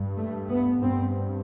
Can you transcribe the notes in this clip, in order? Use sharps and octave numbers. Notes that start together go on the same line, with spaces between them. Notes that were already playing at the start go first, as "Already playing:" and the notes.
Already playing: G2
A3
B3
G2 C4